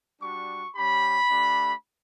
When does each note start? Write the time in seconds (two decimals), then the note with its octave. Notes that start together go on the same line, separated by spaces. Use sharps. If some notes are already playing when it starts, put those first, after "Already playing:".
0.21 G3 D4 F#4 C#6
0.76 G3 C#4 G4 B5
1.30 A3 D4 G4